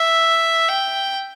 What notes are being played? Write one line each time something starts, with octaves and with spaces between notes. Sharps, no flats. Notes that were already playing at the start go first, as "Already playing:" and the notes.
Already playing: E5
G5